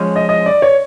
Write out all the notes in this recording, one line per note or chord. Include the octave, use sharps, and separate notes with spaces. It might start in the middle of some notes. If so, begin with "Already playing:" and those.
Already playing: F3 G#3 C#4
D#5
D#5
D5
C#5